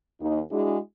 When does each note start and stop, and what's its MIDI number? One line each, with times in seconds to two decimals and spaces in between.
0.20 0.40 39
0.20 0.40 63
0.50 0.78 56
0.50 0.78 62
0.50 0.78 64
0.50 0.78 66
0.50 0.78 68